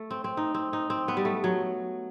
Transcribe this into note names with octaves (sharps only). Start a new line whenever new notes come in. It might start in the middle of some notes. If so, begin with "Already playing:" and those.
Already playing: A3
C4
C4
D#4
C4
D#4
C4
B3
G3
A3
F#3